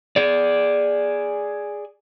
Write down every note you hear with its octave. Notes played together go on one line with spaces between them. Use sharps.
G#4 D5